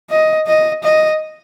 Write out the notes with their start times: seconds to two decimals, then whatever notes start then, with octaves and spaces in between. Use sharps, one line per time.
0.10 D#5
0.47 D#5
0.84 D#5